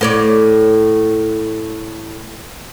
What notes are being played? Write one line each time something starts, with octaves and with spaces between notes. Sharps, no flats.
A2 C#5 D5